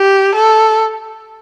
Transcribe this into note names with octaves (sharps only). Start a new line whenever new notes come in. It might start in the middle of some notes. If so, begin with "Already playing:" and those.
Already playing: G4
A4